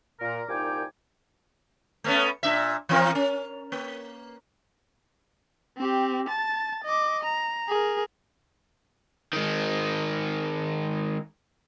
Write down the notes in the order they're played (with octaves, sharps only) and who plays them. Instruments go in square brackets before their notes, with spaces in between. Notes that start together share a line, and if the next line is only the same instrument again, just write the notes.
[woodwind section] A#2 A#4
C2 A#2 D#4 G5 G#5 D6
[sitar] A3 B3 C#4
A#2 D4 E5
E3 C4 A#4
C#4
A#3
[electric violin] C4 G4
A5 A6
D#5 D6
A#5
G#4 A#4
[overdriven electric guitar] D#3 G#3